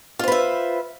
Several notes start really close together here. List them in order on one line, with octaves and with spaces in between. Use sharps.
F4 C5 B4 E5